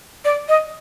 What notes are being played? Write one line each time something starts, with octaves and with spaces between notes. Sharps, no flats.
D5
D#5